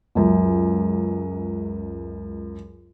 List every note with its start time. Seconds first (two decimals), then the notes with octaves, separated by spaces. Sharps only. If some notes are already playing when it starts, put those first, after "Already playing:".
0.15 C#2 F#2